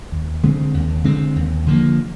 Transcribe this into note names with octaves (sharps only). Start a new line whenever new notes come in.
D#2
D3 G#3 C4
D#2
D3 G#3 C4
D#2
D3 F3 A#3